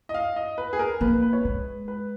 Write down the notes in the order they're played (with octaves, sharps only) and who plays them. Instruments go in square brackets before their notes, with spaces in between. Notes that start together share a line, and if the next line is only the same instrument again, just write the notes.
[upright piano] D#5
F5
D#5
B4
G#4
A#4
[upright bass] A#3 [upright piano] B4
[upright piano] B4
C#5
[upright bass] G#3 [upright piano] B4
[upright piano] B4